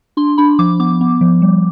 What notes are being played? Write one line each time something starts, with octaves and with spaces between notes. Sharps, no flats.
D4 C6
D4 B5
F3 D6
B3 D6
B3
F3
G3